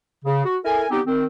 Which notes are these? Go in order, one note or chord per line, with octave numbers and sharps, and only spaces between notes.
C#3
F#4
E4 A4 A#4 G#5
G3 B3 C4 D#4 G4
D#3 C4